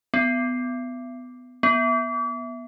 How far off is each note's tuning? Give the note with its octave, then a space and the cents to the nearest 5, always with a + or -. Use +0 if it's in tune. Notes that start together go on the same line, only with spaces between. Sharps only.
B3 +20
B3 -15